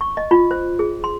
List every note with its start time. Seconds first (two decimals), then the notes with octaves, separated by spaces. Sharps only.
0.01 C#6
0.17 D#5
0.31 F4
0.51 C5
0.79 G#4
1.04 C6